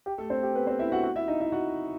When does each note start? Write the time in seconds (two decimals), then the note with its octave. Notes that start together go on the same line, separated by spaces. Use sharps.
0.06 G4
0.18 A3 A4
0.30 C4 C5
0.43 G4
0.55 B3 B4
0.67 C4 C5
0.79 E4 E5
0.92 F#4 F#5
1.03 F#4 F#5
1.16 E4 E5
1.27 D#4 D#5
1.40 E4 E5
1.52 F#4 F#5